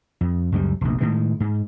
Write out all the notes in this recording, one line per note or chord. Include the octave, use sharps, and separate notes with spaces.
F2
C#2 F#2 F#3 G3
F1 A#1
A2 D#3 G#3
G#2